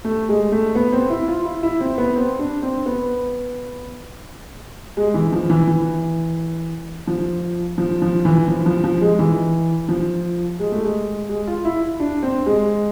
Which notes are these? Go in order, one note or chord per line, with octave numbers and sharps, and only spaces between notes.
A3
G#3
A3
B3
C4
E4
F4
E4
E4
C4
B3
C4
D4
C4
B3
G#3
E3
F3
E3
E3
F3
F3
F3
E3
F3
F3
F3
G#3
E3
F3
G#3
A3
G#3
G#3
F4
E4
D4
C4
G#3